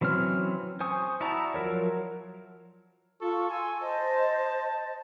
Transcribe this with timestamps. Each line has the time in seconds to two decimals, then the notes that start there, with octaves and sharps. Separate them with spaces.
0.01 E3 F#3 C4 C#4 F6
0.80 C5 G#5 C#6 D#6
1.21 E4 F#4 D5 A5 A#5
1.54 F3 F#3 A#4 C#5
3.21 F4 A4 C#6
3.50 G#5 C6 E6
3.80 C5 D#5 A5